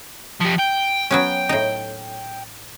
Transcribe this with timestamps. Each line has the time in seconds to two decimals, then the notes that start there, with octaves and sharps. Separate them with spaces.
0.41 F3 G4
0.59 G5
1.11 F#3 B3 C#4
1.49 A2 D#4